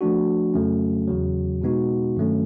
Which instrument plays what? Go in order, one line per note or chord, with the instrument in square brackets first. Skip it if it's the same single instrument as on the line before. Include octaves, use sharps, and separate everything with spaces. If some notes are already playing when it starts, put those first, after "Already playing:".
[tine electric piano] F3 A3 D4 F#4
F2 C#3 F#3 A3 C#4
E2 C#3 F#3
B2 G#3 B3 D#4 F#4
G2 D#3 F#3 A3 C#4